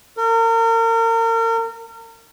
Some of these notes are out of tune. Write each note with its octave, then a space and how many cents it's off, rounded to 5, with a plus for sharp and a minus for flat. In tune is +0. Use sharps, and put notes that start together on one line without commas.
A#4 -35